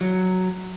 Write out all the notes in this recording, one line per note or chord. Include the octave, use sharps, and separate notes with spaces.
F#3